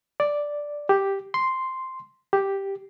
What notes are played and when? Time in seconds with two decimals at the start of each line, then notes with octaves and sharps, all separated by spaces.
0.20 D5
0.89 G4
1.34 C6
2.33 G4